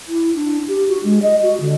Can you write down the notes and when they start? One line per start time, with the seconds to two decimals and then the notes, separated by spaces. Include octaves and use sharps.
0.08 E4
0.35 D4
0.68 G4
0.89 F#4
1.04 G#3
1.23 D#5
1.43 F#4
1.61 D3